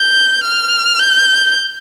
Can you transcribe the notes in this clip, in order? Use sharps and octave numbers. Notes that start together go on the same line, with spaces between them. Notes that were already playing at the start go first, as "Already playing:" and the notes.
Already playing: G6
F6
G6